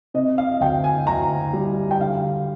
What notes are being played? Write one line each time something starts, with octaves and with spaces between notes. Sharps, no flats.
C3 D#5
F5
D2 G5
G#5
D2 A#5
G3
G5
D3 F5